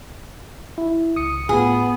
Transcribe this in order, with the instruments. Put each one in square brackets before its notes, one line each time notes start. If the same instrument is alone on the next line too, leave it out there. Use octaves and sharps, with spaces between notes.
[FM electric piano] E4
C#2 D#6 C#7
[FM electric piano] A2 F4 [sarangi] B3 [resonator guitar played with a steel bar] G#4